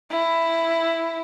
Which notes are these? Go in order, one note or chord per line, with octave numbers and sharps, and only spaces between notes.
E4